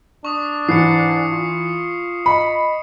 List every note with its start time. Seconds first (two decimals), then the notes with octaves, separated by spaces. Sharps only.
0.25 D4 C#6 D#6
0.69 G#2 E3 C7 C#7
1.32 F4
2.26 D#5 B5 C#7